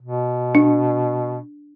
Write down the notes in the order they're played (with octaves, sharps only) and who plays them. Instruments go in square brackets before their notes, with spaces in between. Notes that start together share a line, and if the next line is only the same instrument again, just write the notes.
[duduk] B2
[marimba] D4